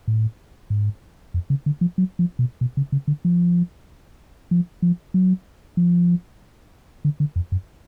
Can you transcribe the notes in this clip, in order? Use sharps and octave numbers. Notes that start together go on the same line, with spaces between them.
A2
G#2
F2
C#3
D3
F3
F#3
F3
B2
B2
C#3
C#3
D3
F3
F3
F3
F#3
F3
D3
D3
F2
F#2